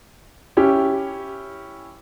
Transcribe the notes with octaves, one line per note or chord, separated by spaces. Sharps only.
C#4 E4 G4